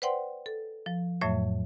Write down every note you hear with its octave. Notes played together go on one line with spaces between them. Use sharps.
B4 C5 D5 F#5 G5 C6
A4
F3
F2 A2 F#3 A3 C#5 E5